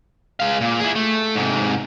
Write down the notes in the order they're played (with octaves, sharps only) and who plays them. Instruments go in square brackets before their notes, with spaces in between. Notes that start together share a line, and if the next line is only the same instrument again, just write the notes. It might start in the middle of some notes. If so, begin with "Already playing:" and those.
[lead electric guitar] G#3 F5
A#2
E4 G#4
A3
G#2 C3